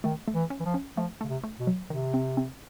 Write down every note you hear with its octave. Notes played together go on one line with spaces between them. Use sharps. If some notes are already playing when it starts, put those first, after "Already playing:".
D#3 A3
A3
E3
C#4
E3
F3
C#4
F3 A3
C#3 A3
C3
A3
B2
F#3
C3 D#3
C4
C4